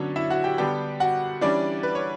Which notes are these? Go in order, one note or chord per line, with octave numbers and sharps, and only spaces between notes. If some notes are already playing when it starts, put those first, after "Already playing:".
Already playing: D3 F#3 B3 C#4 D4 C#5
E4 E5
F#4 F#5
G4 G5
D3 G3 B3 D4 G4 G5
F#4 F#5
E3 G3 C#4 D4 D5
B4
C#5